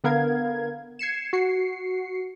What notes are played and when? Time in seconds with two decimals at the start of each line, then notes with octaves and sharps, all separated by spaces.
0.04 D3 B3 A#4 F5 G#6
0.99 G#6 C7 C#7 E7
1.33 F#4 C7 C#7